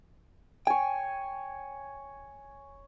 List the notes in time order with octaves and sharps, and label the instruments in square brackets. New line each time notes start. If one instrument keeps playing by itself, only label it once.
[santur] C#5 G#5 [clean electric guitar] G5